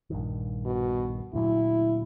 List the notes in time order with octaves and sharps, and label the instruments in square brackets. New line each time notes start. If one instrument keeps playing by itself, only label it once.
[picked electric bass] A#1 G2 D#3
[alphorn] B2
[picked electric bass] D2 A#2 F#3 [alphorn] E4